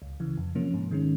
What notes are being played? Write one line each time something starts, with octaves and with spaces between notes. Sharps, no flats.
C#2
C#3 E3
F2
C3 F3 A#3 C#4
G#2
D#3 G#3 C#4